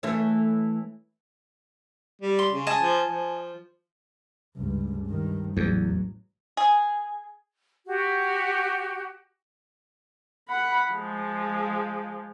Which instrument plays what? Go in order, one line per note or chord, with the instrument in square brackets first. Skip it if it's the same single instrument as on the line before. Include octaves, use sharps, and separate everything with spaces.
[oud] E3 A3 C#4
[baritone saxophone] G3
[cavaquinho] C6
[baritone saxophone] C#3
[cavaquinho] D#5 G#5 A5
[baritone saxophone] F3
F3
[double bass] C#2 G2
G2 D#3
[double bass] A1 F#3 [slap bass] E2
[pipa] G#4
[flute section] F#4 G4
[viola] F#5 B5
F3 G#3